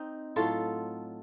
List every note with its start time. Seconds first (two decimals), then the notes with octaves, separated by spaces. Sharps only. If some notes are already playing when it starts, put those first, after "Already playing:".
Already playing: C4 D#4
0.36 A2 F#3 F4 A4